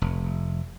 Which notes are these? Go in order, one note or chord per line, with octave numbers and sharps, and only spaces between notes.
F1